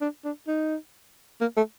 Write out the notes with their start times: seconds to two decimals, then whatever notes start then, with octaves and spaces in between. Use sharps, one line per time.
0.01 D4
0.25 D4
0.48 D#4
1.41 A#3
1.57 A3